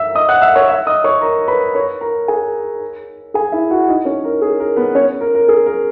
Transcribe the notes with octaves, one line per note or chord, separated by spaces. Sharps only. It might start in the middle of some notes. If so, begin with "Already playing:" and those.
Already playing: E5 E6
D#5 D#6
F#5 F#6
E5 E6
C#5 C#6
E5 E6
D#5 D#6
C#5 C#6
A#4 A#5
B4 B5
C#5 C#6
A#4 A#5
G#4 G#5
G#4 G#5
E4 E5
F#4 F#5
D#4 D#5
C#4 C#5
A#4
G#4
A#4
B3 B4
C#4 C#5
A#4
A#4
G#4
A#4